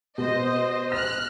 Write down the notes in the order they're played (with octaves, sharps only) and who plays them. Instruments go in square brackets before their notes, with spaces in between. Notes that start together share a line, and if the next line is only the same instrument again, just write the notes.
[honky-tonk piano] B2 [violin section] C5 D#5
[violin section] F6 F#6 [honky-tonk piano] A#6